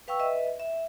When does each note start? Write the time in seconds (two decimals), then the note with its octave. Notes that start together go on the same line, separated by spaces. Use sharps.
0.08 B4 F5 G5 C#6 E6
0.20 B4 D#5 E5
0.60 E5